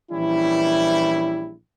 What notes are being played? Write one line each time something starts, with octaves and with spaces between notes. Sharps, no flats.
A#1 E3 G3 C#4 E4